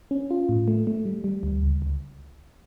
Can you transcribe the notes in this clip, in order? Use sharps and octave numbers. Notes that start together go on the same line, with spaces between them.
C#4
F4
A2
A3
A3
G3
G3
D2
C#2
C#2